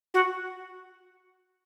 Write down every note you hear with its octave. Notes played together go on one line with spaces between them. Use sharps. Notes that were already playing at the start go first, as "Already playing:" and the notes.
F#4